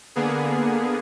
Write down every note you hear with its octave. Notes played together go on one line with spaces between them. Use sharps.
D3 A#3 B3 G#4